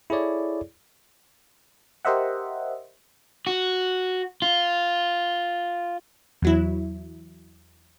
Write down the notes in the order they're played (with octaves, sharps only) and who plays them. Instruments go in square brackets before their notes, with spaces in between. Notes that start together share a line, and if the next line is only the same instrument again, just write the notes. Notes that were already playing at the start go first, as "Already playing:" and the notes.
[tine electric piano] E4 G#4 A4 C#5 D5
[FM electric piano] G4 A#4 C5 D#5 E5 F#5
[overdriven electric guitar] F#4
F4
[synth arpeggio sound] E2 F#3 E4